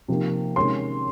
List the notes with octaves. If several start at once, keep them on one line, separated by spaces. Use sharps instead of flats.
C3 F3 A#3 D#4
C3 D#3 G#3 C#4 C6